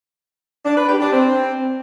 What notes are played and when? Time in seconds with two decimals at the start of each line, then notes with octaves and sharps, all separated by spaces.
0.65 D4
0.77 B4
0.89 G4
1.01 D4
1.12 C4